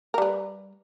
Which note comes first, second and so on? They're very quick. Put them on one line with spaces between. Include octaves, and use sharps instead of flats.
A#4 G3 B4